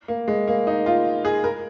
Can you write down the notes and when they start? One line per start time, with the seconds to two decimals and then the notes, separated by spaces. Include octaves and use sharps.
0.08 A#3
0.28 G#3
0.48 A#3
0.67 D#4
0.86 F4
1.25 G#4
1.44 A#4